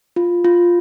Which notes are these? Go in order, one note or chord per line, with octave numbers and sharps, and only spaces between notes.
F4
F4